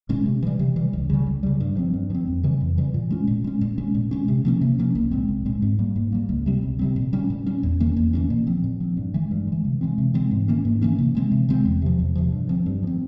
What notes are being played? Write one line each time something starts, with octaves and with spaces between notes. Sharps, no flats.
A#2 G#3 C#4
C3
E3 G3
C3
E3 G3
C#2
C#3 G3
C#2
C#3 G3
G2
F3 C4
G2
F3 C4
F2
C#3 E3 G3
F2
C#3 E3 G3
A#2
G#3 C#4
A#2
G#3 C#4
A#2
G#3 C#4
A#2
G#3 C#4
C3
F3 A#3 C#4
C3
F3 A#3 C#4
C2
A#2 G#3 C4
C2
A#2 G#3 C4
G#2
G3 A#3
G#2
G3 A#3
C#2
C3 G3 C4
C#2
C3 G3 C4
A#2
G3 C#4
A#2
G3 C#4
E2
E3 A#3 C#4
E2
E3 A#3 C#4
A#2
F3 C4
A#2
F3 C4
G2
E3 G#3
G2
E3 G#3
C3
E3 G#3 C4
C3
E3 G#3 C4
G#2
E3 A#3 C#4
G#2
E3 A#3 C#4
C3
E3 G#3 C4
C3
E3 G#3 C4
E2
C3 F3
E2
C3 F3
G2
F3 C4
G2
F3 C4